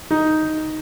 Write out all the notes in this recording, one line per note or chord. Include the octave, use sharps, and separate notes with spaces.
D#4